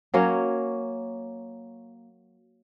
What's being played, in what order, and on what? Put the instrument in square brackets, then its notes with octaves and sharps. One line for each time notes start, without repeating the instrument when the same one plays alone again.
[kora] F#3 A#3 C#4 C#5